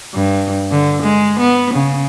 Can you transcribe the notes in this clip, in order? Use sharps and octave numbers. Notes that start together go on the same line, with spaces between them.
G2
D3
G#3
B3
C#3